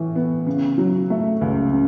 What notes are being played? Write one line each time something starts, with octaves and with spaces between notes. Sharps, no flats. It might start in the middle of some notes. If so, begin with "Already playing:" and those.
Already playing: A2 E3
B3
C#3
F#3
A3
C#2
C#3